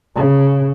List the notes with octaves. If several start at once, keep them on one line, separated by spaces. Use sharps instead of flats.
C#3